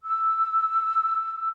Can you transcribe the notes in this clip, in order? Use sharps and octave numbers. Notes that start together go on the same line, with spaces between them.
E6